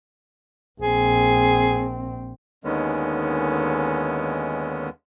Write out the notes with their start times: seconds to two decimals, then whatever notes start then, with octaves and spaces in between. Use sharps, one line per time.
0.81 A#1 C4 G#4
2.64 D#2 D3 D#3 G#3 B3 C#4